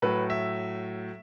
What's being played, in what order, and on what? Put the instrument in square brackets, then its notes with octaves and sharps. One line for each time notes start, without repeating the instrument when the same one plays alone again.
[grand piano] A2 F#3 A3 B4
E5